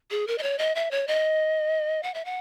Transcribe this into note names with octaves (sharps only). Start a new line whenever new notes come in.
G#4
A#4
D#5
C#5
D#5
E5
C#5
D#5
F#5
E5
F#5